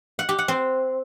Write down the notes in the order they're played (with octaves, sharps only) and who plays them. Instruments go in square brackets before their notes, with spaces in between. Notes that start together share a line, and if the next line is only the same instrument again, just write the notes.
[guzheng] F#5
G4
F#5
C4